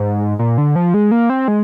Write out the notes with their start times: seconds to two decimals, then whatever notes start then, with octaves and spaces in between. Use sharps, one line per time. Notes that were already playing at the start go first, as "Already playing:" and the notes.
Already playing: G#2
0.39 A#2
0.58 D3
0.76 F3
0.94 G#3
1.11 A#3
1.30 C4
1.48 G#3